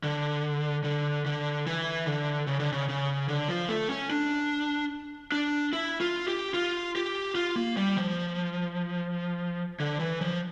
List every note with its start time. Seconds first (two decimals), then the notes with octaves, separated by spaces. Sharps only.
0.03 D3
0.84 D3
1.26 D3
1.67 E3
2.06 D3
2.47 C#3
2.60 D3
2.72 C#3
2.88 C#3
3.28 D3
3.48 F3
3.69 A3
3.90 C#4
4.10 D4
5.32 D4
5.73 E4
6.01 F4
6.28 G4
6.54 F4
6.96 G4
7.35 F4
7.56 A#3
7.77 G3
7.97 F3
9.80 D3
9.99 E3
10.21 F3